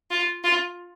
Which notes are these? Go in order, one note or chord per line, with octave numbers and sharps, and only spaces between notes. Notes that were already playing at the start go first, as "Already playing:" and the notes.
F4
F4